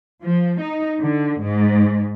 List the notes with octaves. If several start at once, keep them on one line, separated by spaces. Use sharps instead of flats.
F3
D#4
D3
G#2